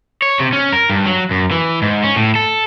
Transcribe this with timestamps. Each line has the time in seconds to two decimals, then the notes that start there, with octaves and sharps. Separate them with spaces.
0.22 C#5
0.39 C3
0.53 C#4
0.72 A#4
0.90 G2
1.06 F#3
1.31 F#2
1.51 E3
1.82 G#2
2.04 C#4
2.16 A2
2.36 A4